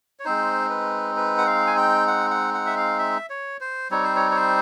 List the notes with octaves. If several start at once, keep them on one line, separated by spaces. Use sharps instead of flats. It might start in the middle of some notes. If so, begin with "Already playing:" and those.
C#5
G#3 C4 D#4 C5
B4
B4
F#5
F5
G#5
G5
F#5
F#5
F#5
E5
F5
E5
C#5
C5
G3 C4 D#4 C#5
C5
C#5
C#5
C5